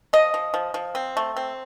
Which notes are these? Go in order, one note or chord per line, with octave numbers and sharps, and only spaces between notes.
F3 D#5
F3
F3
F3
C4
A3
C4